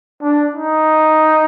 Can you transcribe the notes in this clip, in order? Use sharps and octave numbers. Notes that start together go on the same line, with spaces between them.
D4
D#4